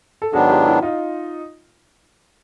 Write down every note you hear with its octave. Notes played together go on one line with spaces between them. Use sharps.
A4
G#2 D#3 F#3 B3 D4 F#4 G#4
F4 G4
E4 F#4
D#4 F4